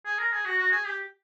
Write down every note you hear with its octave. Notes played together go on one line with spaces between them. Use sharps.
G#4
A#4
G#4
F#4
F#4
G#4
G4